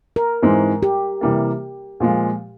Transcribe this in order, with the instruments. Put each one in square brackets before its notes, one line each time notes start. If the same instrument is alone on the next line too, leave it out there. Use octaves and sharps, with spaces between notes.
[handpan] A#4
[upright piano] G#2 E3 G#3 C4
[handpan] G4
[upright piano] C3 E3 G3 A#3
A#2 F3 G#3